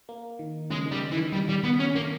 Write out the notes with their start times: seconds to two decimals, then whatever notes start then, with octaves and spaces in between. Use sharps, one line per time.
0.09 A#3
0.39 D#3
0.70 C#3 G#3
0.86 D#3
0.92 G3
1.12 E3
1.17 D#3
1.33 G3
1.49 G3
1.63 B3
1.79 C#4
1.95 A#3